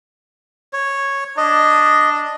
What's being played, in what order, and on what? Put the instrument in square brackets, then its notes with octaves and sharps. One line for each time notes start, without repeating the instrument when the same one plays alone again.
[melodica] C#5
[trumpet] D4 [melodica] D#5